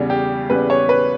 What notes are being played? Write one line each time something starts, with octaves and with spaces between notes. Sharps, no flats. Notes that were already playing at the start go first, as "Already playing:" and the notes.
Already playing: E2 C#3 G3
G4
E2 C#3 G3 B4
C#5
B4